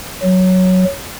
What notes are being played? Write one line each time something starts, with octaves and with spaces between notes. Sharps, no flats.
F#3